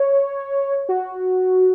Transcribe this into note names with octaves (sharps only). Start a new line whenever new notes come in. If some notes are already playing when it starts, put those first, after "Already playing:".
Already playing: C#5
F#4